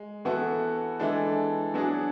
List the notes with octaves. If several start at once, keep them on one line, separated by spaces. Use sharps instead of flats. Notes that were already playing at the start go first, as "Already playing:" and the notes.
Already playing: G#3
E3 B3 F#4 A4
E3 G#3 D4 A4
F#3 B3 D4 G#4